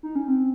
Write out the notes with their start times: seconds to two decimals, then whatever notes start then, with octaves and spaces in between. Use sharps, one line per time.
0.03 D#4
0.15 C#4
0.28 C4